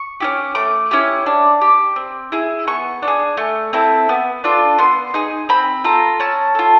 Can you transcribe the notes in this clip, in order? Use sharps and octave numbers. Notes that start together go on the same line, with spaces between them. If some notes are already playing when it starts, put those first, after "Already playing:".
Already playing: C#6
C#4 E4 G4
A3 D6
C#4 E4 G4
D4
G4
C4
E4 G#4
B3 C#6
D4 F4
G#4
A3
C4 E4 A4
B3
D4 F4 A4
B3 C6
D#4 G#4
C4 B5
F4 A4 A#5
C#4 A5
F4 A4